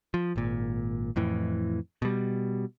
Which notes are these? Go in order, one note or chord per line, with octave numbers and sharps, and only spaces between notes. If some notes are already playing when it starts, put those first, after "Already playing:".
F3
G#1 A#2
F2 A2 E3
B2 G3